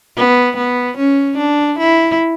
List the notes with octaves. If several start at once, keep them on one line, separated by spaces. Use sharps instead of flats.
B3
B3
C#4
D4
E4